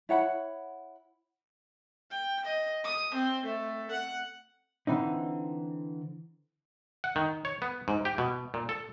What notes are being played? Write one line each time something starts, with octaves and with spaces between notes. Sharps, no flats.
E4 C#5 F#5 B5
G5
D#5
D#6
C4
A3
F#5
D3 E3 C4 D#4
F#5
D#3
C#5
B3
G#2
G4
B2
A#2
A4